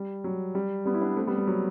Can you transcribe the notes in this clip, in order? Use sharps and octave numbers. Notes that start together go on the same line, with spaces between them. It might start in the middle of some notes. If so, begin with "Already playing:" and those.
Already playing: G3
F#3
G3
G3 B3
E4
B3 D4
A3 C4
G3 B3
G3
F#3